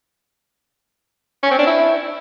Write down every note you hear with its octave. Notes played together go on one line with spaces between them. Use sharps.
C#4
C4
D4
E4